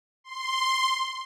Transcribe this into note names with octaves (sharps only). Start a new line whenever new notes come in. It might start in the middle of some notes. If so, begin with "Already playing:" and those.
C6